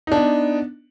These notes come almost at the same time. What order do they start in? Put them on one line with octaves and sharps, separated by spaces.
D#4 D4 B3